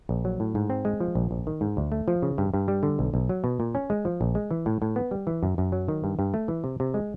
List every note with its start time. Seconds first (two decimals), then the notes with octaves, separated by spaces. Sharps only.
0.09 A#1
0.25 F#3
0.40 A2
0.55 G#2
0.70 C4
0.85 G#3
1.00 F3
1.15 A#1
1.31 A#1
1.47 D#3
1.61 G#2
1.77 D2
1.92 A3
2.08 F3
2.22 C#3
2.38 G2
2.54 G2
2.68 G3
2.83 D3
2.99 B1
3.14 B1
3.29 F#3
3.44 B2
3.60 A#2
3.75 C#4
3.90 G#3
4.05 F3
4.21 A#1
4.35 G#3
4.51 E3
4.66 A2
4.82 A2
4.96 B3
5.11 G3
5.27 E3
5.43 F#2
5.58 F#2
5.72 F#3
5.88 D#3
6.04 G2
6.19 G2
6.34 A3
6.48 E3
6.64 C3
6.80 C3
6.94 G#3